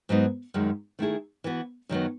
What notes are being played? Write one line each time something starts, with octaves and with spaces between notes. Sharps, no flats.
G#2 F#3 B3 D#4
F#2 D#3 G#3
D#3 A3 E4 G#4
E3 B3 F#4
F#2 D#3 F#3 B3